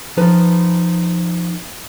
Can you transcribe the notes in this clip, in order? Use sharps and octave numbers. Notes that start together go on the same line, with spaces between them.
F3 D#4 B4 A5